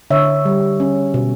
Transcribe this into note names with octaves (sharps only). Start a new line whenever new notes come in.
D3 C#5 E5
G3
C#4
B2